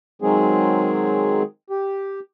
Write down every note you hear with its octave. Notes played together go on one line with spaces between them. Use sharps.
D#3 F#3 G#3 C4 G#4
G4